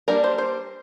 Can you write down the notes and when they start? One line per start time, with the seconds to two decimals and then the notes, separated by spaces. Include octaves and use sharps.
0.08 G3 A#3 D4 A#4
0.24 C5
0.38 C5